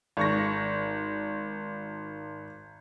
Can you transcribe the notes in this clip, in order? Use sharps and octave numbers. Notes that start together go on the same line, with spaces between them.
G#1 C#6 A#6